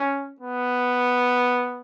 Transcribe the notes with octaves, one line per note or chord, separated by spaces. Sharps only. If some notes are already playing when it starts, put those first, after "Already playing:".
Already playing: C#4
B3